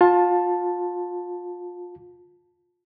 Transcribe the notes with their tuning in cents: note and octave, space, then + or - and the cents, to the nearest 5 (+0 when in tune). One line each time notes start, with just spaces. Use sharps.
F4 +25 A5 +0